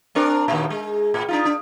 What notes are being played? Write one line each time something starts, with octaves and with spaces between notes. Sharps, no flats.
C4 D4 A#4
D#2 A#2
G#3
A2
D4 D#4 F4
D4